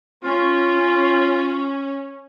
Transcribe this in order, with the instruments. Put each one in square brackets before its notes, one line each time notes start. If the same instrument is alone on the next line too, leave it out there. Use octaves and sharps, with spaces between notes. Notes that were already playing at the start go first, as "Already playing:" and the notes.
[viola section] C#4 [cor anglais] F4